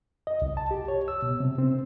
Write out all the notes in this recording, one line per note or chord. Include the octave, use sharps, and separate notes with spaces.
D#5
C2
A5
G4
C#5
E6
B2
C3
C4